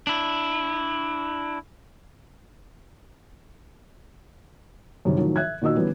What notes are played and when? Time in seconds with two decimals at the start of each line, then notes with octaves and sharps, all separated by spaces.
0.07 D4 E4
5.05 F#2 C3 D#3 G3
5.17 A2 D#3 F3 F#3
5.36 E5 F#6 G#6
5.62 A#2 D#3 F#4 D#5 E6
5.76 D3 E3 G3 B3 C#4